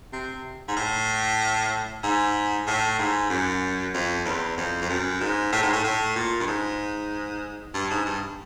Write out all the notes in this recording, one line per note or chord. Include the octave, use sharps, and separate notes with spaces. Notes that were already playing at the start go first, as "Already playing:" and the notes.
C3
G#2
A2
G#2
A2
G#2
F#2
F2
E2
F2
F2
F#2
G#2
A2
G#2
A2
A2
A#2
G2
G#2
G2
G#2
G2